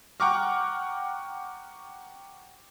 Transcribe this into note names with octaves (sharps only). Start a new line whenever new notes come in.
F#5 G5 A#5 C#6 D6 F6